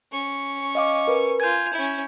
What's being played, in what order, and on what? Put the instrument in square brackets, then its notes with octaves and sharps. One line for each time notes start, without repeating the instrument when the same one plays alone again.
[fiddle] C#4 C#6
[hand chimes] D#5 F5 D6
A#4 B4
[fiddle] F4 G#5 [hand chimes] G6 G#6
[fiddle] C#4 E4